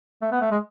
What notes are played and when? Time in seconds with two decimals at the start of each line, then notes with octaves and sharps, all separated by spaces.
0.22 A3
0.32 B3
0.41 A3
0.51 G#3